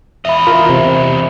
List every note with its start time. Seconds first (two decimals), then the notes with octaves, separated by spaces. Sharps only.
0.25 E2 D#5 E5 B5
0.47 F4 A#4 B5
0.69 C3